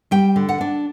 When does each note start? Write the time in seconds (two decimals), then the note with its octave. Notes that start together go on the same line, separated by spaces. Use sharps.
0.11 G3 G5
0.36 D3
0.49 F#5
0.61 D4